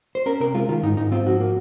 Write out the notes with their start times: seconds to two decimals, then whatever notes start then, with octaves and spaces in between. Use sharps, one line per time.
0.15 C5
0.26 C#4 A#4
0.40 C3 A#4
0.54 G#3 F4
0.69 D#3 F4
0.83 G#2 D#4
0.97 G#2 D#4
1.12 C4 F4
1.26 F3 F#4
1.40 A#3